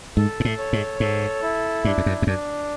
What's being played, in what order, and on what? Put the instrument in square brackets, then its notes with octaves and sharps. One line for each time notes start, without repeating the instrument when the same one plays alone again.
[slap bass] G#2 [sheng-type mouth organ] A4
[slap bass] G#2
A2
[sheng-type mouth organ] C#5
[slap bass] G#2
[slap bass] G#2 [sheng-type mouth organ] A4
[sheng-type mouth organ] E4
[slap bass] G2 [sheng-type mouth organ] D4
[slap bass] F2
F#2
F2
[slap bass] F#2 [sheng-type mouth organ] D4